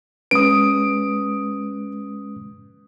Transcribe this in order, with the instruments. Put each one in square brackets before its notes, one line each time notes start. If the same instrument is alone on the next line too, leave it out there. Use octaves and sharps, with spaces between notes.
[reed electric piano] G#3 C#4 B4 [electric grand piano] D#6 D7